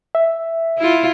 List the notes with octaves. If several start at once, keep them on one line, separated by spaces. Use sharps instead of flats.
E5
E4 F4